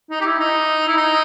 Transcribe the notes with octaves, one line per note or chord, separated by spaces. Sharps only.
D#4
G4
E4
D#4
E4
D#4